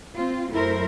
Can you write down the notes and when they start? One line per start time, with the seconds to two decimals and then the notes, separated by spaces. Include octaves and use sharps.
0.15 C4 F4
0.50 F#2 A3 E4 A#4 C5